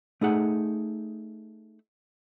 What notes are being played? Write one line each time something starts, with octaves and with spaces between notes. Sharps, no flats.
A3 D#4 G#4 F#5